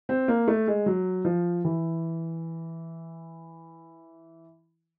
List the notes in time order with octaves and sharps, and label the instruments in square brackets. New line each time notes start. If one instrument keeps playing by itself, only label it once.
[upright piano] C4
A#3
A3
G#3
F#3
F3
E3